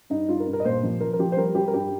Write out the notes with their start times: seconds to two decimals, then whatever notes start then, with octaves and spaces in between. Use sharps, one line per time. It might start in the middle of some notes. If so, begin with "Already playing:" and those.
0.10 G2 D#4
0.28 G2 F4
0.40 A#4
0.47 G2
0.53 A#4
0.60 D#5
0.65 A#2 C5
0.83 F3
1.00 F3 A#4
1.13 A#4
1.19 F3 G4
1.32 C5
1.37 G3 A#4
1.55 G3 G4
1.68 A#4
1.74 G2 G4